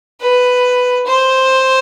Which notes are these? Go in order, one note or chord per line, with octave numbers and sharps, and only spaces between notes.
B4
C5